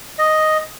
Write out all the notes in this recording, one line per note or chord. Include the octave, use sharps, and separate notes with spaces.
D#5